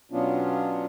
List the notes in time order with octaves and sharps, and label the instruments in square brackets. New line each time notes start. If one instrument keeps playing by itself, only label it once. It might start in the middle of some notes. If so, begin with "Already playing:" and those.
[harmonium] B2 F#3 B3 C#4 D4 F4